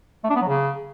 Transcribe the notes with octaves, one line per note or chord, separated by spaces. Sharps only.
A3
D4
B3
F#3
C#3